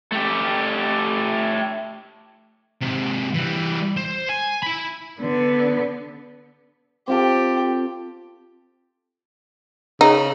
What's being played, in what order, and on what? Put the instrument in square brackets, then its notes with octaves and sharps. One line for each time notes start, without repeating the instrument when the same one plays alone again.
[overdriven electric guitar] A3 G4
[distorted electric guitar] G#2 C3
E3 G3
C5
G#5
E4 B5
[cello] D3 B3
[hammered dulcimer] C4 F4 A4 [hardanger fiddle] G4
[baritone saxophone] C#3 [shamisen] D#4